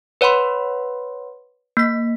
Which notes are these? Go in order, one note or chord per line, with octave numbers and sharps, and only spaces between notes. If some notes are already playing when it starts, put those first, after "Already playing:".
B4 C#5 F#5 B5 C6
A#3 B6